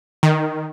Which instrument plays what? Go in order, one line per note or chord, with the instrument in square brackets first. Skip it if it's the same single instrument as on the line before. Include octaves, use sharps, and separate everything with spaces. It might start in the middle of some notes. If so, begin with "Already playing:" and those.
[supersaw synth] D#3